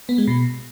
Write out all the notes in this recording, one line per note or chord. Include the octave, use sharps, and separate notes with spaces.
B3
G#3
B2